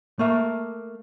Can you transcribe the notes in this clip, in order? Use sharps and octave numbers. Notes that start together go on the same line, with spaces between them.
A3 A#3 E5